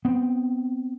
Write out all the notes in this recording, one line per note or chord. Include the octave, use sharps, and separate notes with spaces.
B3 C4